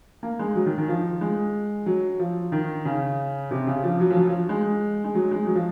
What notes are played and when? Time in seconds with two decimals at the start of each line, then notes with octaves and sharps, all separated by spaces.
0.23 A#3
0.39 G#3
0.55 F#3
0.66 D#3
0.77 D#3
0.88 F3
1.21 G#3
1.86 F#3
2.20 F3
2.52 D#3
2.85 C#3
3.51 C3
3.67 C#3
3.84 F3
4.00 F#3
4.10 F3
4.16 F#3
4.27 F3
4.49 G#3
5.04 G#3
5.15 F#3
5.31 G#3
5.47 F#3
5.55 F3